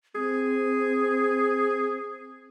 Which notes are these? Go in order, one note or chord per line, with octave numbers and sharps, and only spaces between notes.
C4 G#4